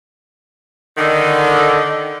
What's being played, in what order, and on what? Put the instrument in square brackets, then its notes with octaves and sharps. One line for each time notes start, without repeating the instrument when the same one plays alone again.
[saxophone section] D3 D#3